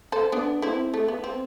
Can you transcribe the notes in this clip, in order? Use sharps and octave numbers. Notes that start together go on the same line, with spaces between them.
A4 C5
B3 D4
C4 E4
A3
B3
C4